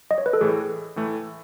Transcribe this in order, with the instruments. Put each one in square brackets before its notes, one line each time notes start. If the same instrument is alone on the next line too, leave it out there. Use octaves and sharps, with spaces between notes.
[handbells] D#5
C#5
B4
A4
[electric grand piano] A2 E3 A3 [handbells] G#4
[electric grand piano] A2 E3 A3